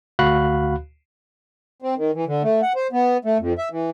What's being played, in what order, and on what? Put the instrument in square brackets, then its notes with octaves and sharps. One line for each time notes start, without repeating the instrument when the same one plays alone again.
[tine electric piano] D2 F#4 F5 B5 F#6
[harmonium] C4
D#3
E3
D3
A3
F#5
C5
B3
A3
F2
E5
E3